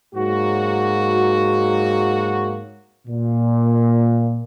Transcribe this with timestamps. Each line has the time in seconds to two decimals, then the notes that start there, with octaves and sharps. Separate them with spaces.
0.14 G#2 F#3 A#3 F#4
3.07 A#2